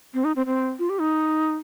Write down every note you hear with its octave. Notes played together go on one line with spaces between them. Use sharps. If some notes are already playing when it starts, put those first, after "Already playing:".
C4
D#4
C4
C4
F4
G4
D#4